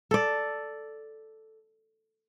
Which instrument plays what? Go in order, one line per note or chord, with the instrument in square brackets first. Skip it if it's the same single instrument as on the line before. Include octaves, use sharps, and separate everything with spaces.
[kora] A4 D5